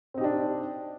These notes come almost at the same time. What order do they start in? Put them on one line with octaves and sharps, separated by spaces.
C4 D#4 G4 D4